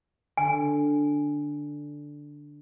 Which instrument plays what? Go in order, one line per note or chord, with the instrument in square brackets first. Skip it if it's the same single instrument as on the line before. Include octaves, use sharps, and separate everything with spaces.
[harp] D3 [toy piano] G#5